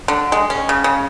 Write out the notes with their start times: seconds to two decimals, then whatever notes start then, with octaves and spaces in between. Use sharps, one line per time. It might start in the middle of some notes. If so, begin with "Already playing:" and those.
0.08 D3
0.32 G#3
0.50 C#4
0.69 C#3
0.84 C#3